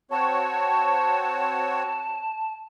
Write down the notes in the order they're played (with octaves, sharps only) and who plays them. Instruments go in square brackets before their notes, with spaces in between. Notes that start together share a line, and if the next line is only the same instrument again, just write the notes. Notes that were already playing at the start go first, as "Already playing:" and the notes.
[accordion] C4 F#4 C#5 [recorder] A5